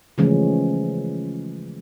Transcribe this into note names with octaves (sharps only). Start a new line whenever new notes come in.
C#3 E3 F3 G#3 A3 C#4